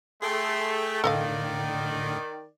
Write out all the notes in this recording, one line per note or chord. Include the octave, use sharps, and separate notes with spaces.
A3 G#4 A4 G5 C6
A2 D3 D#3 A4 D5 D#5 F5